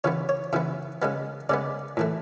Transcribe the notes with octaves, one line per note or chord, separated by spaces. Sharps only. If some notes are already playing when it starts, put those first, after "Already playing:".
C#3 E3 B3 C#5
C#5
C#3 E3 B3 E5
C#3 G#3 B3
C#3 G#3 B3 D5
A2 E3 A3